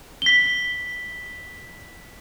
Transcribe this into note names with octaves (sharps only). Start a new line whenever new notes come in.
B6 G7